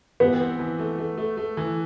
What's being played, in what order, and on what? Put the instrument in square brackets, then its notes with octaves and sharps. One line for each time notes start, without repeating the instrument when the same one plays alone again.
[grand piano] E3 [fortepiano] B3
[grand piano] C4
E3
A3
A3
A3
A3
E3